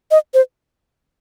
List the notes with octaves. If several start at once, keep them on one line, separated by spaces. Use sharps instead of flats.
D#5
C5